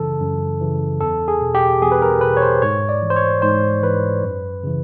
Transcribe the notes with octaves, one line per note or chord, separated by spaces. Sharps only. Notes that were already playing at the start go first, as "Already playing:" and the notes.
Already playing: F#2 C#3 E3 A4
F#2
C#3 E3
E2 A4
G#4
B2
G4
E2 G#4
B4
A#4
B2 B4
C#5
C5
G#2 C#5
D5
E3
C5
C#5
G#2 C5
E3 B4
F#2
C#3 E3